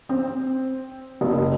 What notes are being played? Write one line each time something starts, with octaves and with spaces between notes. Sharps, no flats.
C4
F#1